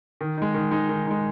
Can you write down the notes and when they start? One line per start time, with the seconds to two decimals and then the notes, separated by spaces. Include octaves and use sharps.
0.21 D#3
0.37 G#3 D#4
0.54 D#3
0.71 G#3 D#4
0.89 D#3
1.06 G#3 D#4